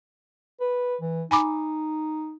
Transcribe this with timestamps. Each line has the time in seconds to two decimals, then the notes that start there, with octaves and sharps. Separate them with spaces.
0.60 B4
1.01 E3
1.31 D#4 G#5 B5 D6